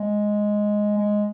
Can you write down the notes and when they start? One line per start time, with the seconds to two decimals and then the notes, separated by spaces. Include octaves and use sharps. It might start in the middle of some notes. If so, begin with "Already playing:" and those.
Already playing: G#3
0.98 G#3